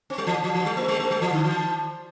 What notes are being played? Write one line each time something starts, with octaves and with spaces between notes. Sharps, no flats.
C4
G3
E3
E3
E3
G3
A3
G3
A3
G3
E3
D3
E3